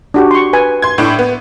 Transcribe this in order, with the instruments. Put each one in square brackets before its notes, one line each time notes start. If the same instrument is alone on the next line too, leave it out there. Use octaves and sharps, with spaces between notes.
[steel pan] D4 F#4 G4
C6 C#6
B4 G#5
[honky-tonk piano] C6 G#6
A2 D4
B3